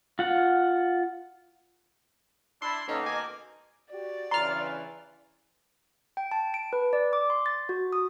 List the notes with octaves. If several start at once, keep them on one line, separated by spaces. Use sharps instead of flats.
F4 F#5
D4 E4 C6
B2 D#3 A#3 C#4 D#4 A4 D#5
G#5 D6
F#4 G4 D5
G2 C#3 E3 A#5 C6 F6
G5
A5
D7
B4
D5
D6
C6
A6
F#4
D#6